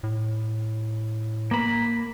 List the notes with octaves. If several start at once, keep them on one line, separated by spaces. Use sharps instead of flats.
A2
A#3 B5